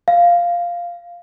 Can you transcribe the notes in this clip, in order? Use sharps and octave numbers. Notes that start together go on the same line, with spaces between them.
F5